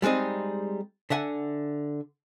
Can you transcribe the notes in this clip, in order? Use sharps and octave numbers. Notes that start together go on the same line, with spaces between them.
G3 G#3 C4 D#4 G#4
D3 E5 F#5 G#5